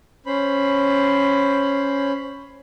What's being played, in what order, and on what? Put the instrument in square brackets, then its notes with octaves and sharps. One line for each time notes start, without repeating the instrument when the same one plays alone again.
[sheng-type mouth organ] C#4 C5 B5